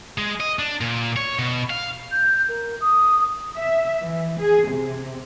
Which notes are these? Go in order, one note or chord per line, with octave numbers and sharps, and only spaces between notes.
G#3
D#5
D4
A#2
C#5
B2
F5
G6
A#4
D#6
E5
E3
G#4
C3